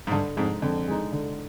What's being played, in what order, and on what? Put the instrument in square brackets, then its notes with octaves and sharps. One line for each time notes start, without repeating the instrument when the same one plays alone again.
[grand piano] G#2
[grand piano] G2 [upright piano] D3
[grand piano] F2 G#2 [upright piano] G#3 D#4
[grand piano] F2 [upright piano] D3
[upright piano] G#3 D#4
D3